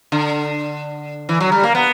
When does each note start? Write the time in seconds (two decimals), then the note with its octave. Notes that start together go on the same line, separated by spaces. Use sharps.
0.12 D3
1.29 E3
1.40 F#3
1.52 G3
1.64 A#3
1.75 B3